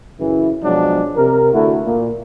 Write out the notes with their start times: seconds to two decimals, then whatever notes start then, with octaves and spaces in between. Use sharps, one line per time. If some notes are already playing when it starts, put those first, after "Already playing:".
0.20 F#2 C#3 E3
0.64 B2 F3 F#3 G#3 D4
1.17 C3 A#4
1.53 D3 A3 E4 F#4
1.85 A#2